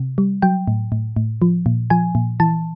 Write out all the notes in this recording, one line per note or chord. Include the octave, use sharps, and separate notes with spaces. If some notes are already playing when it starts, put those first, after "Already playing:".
Already playing: C3
G3
F#3 G5
A2
A2
A2
F3
A#2
F3 G#5
A#2
E3 A5